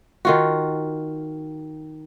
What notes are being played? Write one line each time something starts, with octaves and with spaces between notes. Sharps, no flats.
D#3 F4 F#4